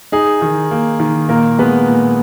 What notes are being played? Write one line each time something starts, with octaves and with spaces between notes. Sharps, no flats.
D#4 G#4
D#3
A#3
D#3
A#2 A#3 A#4
G#3 B3 B4
A#2